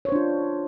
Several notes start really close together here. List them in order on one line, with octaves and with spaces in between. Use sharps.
C#5 C5 D4 F4